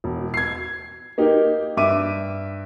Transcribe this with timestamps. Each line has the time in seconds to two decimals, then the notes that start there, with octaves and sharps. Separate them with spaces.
0.04 E1
0.34 G#6 C7
1.18 A#3 D#4 G4
1.77 G2 E5 D6 D#7